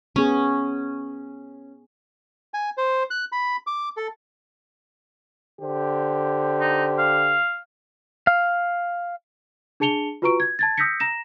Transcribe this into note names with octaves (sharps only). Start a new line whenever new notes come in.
B3 C#4 G#4
G#5
C5
F#6
B5
D6
A4
D3 G4 C5
D#4
F5
F5
D4 G#4 A5 C#7 F7 G7
F4 F#4 B4 A#5 C#6 D7
G#6
A5 G#6 A6
D#6 E6 G6 A#6 B6 C#7
A#5 A#6 E7